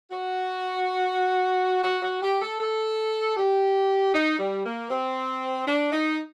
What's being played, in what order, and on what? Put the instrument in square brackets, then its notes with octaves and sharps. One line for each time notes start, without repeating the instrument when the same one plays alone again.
[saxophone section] F#4
F#4
F#4
G4
A4
A4
G4
D#4
G3
A#3
C4
D4
D#4